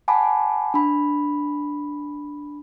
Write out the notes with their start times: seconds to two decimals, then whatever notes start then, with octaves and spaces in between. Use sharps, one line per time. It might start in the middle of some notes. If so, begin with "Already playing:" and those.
0.08 F#5 G#5 A5 B5 D6
0.74 D4 B5